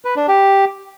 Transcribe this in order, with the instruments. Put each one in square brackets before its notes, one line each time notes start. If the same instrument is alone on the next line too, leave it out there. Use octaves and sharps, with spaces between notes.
[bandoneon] B4
D4
G4